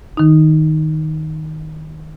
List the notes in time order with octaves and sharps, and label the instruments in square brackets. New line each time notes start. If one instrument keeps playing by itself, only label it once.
[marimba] D#3 D#4